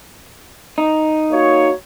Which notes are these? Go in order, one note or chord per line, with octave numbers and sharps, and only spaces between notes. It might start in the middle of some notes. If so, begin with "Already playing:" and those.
D#4
A#3 F#4 C#5